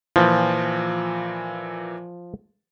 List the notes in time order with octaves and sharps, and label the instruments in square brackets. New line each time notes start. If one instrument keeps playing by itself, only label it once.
[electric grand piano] A#2 E3 [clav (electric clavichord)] F3